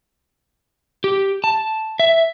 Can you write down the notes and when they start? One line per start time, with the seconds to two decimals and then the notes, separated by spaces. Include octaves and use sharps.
1.04 G4
1.44 A5
2.00 E5